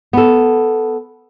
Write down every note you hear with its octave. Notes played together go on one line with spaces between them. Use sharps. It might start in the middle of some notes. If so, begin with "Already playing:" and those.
B3 A4